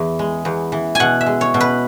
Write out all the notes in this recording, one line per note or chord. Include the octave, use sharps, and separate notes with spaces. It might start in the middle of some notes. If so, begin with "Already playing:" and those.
Already playing: E2 E3
G#3
E2
E3
B2 F#5 G#5
E5
G#3
C#5
B2
B4